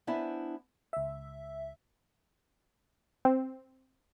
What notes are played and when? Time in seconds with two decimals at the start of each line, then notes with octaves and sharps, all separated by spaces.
0.07 B3 D4 E4 C5 E5 G#5
0.93 C#2 E5
3.25 C4